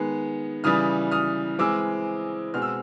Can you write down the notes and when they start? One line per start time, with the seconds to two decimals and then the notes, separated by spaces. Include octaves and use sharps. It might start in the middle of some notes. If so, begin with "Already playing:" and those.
Already playing: D#3 G#3 B3
0.64 C#3 E3 G3 D#6 F6
1.11 D#6 F6
1.59 E3 G#3 C4 D6 E6
2.54 B2 G#3 C4 F6
2.62 E6